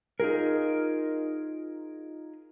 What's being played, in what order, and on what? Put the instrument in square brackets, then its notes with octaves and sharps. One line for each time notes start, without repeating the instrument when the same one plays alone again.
[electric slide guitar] D#4 F4 G#4 A#4